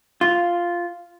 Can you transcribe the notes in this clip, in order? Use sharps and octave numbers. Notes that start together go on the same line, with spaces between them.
F4